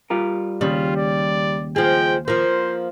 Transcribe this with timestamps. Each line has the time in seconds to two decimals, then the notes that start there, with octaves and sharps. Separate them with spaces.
0.10 G3 F4 A#4
0.61 D#2 C#3 G3 F4
0.96 D5
1.76 F3 G#3 G5
2.28 F3 A#3 C5